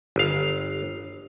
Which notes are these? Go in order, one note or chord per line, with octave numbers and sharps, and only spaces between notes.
G1 F5